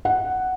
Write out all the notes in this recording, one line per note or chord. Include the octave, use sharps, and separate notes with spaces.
F#5